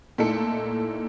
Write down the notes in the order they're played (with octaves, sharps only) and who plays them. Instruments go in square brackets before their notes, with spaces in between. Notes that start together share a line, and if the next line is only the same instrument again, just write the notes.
[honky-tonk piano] A#2 A3 D#4 E4 A4 C#7